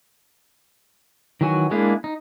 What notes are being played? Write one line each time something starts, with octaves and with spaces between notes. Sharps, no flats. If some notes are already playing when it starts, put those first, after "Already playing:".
D#3 E3 F#3 F#4 G#5
G#3 A#3 D4 E4 G#4
D#4